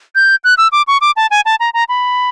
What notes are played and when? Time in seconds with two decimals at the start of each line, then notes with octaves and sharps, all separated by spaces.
0.15 G6
0.44 F#6
0.58 E6
0.72 D6
0.88 C#6
1.01 D6
1.17 A5
1.31 G#5
1.45 A5
1.60 A#5
1.74 A#5
1.89 B5